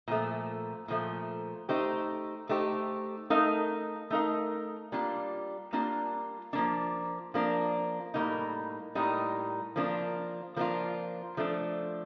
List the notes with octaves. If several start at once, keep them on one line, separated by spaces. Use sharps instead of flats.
A#2 F3 A3
A#2 F3 A3
A3 D#4 G4 C5
A3 D#4 G4 C5
A3 D#4 A#4 F5
A3 D#4 A#4 F5
G3 A#3 D4 F4
G3 A#3 D4 F4
F3 A#3 D4
F3 A#3 D4
A2 G3 A#3 D#4
A2 G3 A#3 D#4
F3 A#3 D4 F4
F3 A#3 D4 F4
F3 A3 D4